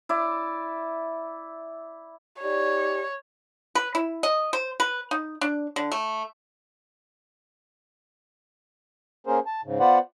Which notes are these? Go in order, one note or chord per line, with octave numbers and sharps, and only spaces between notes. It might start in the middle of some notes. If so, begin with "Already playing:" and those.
E4 D5
D#4 G4 C#5 D5
B4
E4
D#5
C5
B4
D#4
D4
D3
A3
A#3 C#4 G#4 A#4 C5
A5
G#2 C#3
B3 F4 B4 C5 D5 F#5